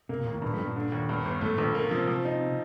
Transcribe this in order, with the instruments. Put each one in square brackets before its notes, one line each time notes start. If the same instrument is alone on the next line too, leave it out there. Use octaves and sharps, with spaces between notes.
[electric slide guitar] C3 [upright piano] A#3
[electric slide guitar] A#2
[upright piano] D#2
[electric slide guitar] A2
[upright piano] G2 [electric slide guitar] A#2
[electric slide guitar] F3 A3
[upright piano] G2
[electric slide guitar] A#2
[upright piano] D3
D#2
G2
G1
[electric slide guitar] A2 [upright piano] A3
[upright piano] A#1 [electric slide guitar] A#2
[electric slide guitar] D3 [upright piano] A#3
[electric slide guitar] C3 [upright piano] F3
[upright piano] F3
D#4